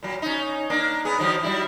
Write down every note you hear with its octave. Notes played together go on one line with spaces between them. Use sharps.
A#2 F#3
C#4 D#4
A#3 D4
B3 G#4
D#3 F3 F#3
F#3 G3 E4